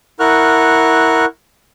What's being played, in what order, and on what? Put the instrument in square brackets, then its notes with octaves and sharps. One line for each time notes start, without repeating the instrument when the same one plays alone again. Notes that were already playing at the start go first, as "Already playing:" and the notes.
[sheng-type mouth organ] E4 A#4 F#5 C#6 F6 F#6